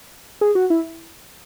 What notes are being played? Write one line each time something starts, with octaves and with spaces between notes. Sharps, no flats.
G#4
F#4
E4